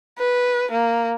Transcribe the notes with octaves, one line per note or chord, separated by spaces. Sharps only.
B4
A#3